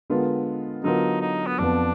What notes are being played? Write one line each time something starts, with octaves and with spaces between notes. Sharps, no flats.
D3 G#3 B3 F4 A#4
D3 F#3 B3 D#4 F4 A#4
D#4
B3
F2 F3 B3 D4